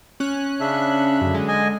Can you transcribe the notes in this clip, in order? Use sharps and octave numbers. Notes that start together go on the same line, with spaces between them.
C#4 F#6
C#3 D4 E5
F#2 D3
D3 G#3
D#5 G#5